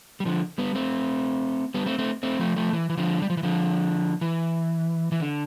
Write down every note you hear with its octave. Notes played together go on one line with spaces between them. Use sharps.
G3
D3 F3
G3 B3
A3 C4
G3 B3
A3 C4
A3 C4
A3 C4
F3 A3
F3 A3
E3
E3
D3 F3
G3
F3
E3
D3 F3
E3
E3
D3